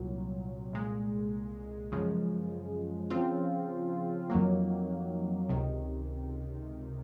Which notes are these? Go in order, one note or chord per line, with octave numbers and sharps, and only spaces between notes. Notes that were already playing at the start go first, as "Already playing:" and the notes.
Already playing: C2 A#2 F#3
C2 A#2 G#3
F#2 C#3 F3 G#3
C#3 F3 C4 F4
F2 D#3 F#3 A#3
C#2 C3 D#3